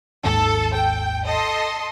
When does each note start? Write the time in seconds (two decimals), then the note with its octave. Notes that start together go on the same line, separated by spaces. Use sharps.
0.24 G#1 D#2 G#2 A4
0.73 G5
1.25 A4 D#5 C6